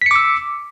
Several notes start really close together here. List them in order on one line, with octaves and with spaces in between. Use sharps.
B6 C#7 D6 E6